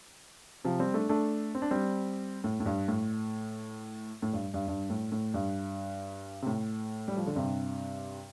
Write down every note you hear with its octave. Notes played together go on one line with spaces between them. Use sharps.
C3 F3
G3 C4
A3 D4
A3 D4
C4
D4
G3 C4
A2
A2
G2
A2
A2
G2
G2
G2
A2
A2
G2
C3
A2
G3
F3
D3
G2 C3